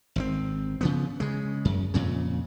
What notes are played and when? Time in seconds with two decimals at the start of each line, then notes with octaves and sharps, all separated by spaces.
0.16 G#1 C#3 C4
0.81 C#3 F3 B3
1.20 C#3 G#3
1.65 F#2
1.94 F2 A#2 C#3